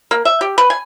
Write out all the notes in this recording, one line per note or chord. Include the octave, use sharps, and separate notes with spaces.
A#3
E5
G4
B4
G#5